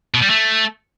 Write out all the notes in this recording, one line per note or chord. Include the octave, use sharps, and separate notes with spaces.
B2
G3
A3